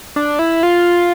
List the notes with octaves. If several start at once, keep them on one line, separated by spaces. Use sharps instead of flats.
D4
E4
F4